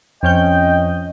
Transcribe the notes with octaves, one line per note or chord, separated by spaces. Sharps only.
F2 C#4 D#5 G5 G6